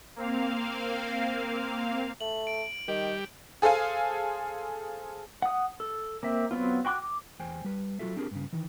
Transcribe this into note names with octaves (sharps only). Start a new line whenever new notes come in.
A#3 C4 F5
A3 F#7
D7
D#3 G3 G4
G#4 A4 C5 F5 G#5
F#5 D#6
A4
A#3 C4 E5
F#3 B3 C4 F4
F#4 G5 C6 D6 F#6
D6
E2 C5 G5 G#5
G3 B4
F#3 F4 F#4 A4 E5
C4 D4 G4 G#4 A#4
G2 C#3
D#3 E3